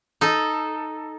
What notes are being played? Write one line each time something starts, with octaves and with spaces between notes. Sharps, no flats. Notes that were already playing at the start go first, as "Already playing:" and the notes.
D#4 A4